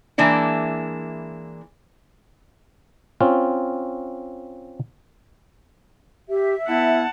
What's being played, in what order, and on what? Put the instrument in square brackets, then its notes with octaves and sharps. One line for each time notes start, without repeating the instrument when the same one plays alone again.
[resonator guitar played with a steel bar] E3 G#3 A#3 D4 E4
[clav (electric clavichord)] C4 C#4 F4
[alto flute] G4 [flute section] E5
[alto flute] B3 [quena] E4 [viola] F#5 A5